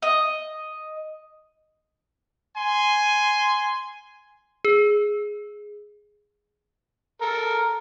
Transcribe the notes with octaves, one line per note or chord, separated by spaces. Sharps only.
D#5
G#5 C6
G#4
A4 A#4